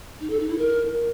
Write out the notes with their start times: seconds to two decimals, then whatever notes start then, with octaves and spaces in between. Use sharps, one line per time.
0.21 D#4
0.30 A4
0.39 D#4
0.49 E4
0.58 A#4